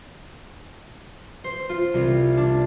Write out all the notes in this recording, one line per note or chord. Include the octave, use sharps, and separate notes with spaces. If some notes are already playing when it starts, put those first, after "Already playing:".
C5
F4
C2
D4